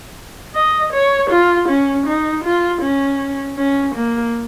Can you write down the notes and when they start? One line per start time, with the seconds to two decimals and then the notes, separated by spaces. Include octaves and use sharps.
0.55 D#5
0.93 C#5
1.31 F4
1.69 C#4
2.07 D#4
2.44 F4
2.82 C#4
3.57 C#4
3.95 A#3